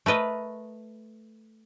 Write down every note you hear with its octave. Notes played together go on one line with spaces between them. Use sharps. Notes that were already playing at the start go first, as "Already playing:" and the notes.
A3 A#4 B4 D#5